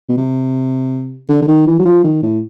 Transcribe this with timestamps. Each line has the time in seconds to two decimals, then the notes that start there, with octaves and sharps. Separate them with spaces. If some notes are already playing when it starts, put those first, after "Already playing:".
0.09 B2
0.17 C3
1.29 D3
1.42 D3
1.48 D#3
1.67 E3
1.79 F#3
1.85 F3
2.04 D#3
2.23 A2